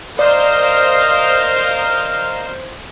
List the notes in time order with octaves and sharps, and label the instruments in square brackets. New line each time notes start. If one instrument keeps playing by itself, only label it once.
[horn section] A#4 D#5 F5 [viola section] C5 [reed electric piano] D5